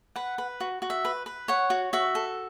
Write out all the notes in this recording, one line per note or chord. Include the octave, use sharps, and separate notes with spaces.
B4 F#5
B4
F#4
F#4
E5
B4
B4
C#5 F#5
F#4
F#4 E5
A4